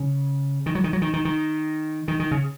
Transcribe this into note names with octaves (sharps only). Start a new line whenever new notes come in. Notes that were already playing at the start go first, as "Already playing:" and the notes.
Already playing: C#3
D#3
F#3
D#3
F#3
D#3
D#3
D#3
D#3
D#3
C#3